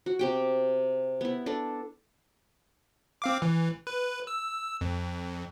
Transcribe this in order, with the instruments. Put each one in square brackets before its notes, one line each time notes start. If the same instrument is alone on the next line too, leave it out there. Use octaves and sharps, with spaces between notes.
[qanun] F#4
C3 G4 G5
B3 E4
D4 A4
[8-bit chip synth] C4 F5 D6
E3
B4
E6
F2